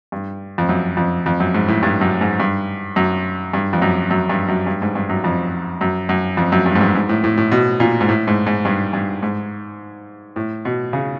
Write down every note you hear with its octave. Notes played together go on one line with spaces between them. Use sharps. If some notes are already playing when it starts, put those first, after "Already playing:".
G2
F2
F#2
F2
F2
F#2
G#2
A2
G2
F#2
G#2
G2
F#2
G2
F2
F#2
F#2
G2
F#2
G2
G#2
G2
F#2
F2
F#2
F#2
F2
F#2
G2
G#2
G2
G#2
A2
A2
A2
B2
A#2
G#2
A2
G#2
G#2
G2
G2
G#2
A2
B2
C#3